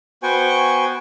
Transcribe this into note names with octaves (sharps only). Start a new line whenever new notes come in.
B3 F#4 C5 G5 G#5 C#6